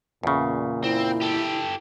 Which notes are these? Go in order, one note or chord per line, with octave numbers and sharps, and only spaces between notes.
E2 A#2 C#3
C4 E4
G4 A4